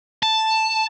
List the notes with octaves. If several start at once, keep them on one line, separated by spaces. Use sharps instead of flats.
A5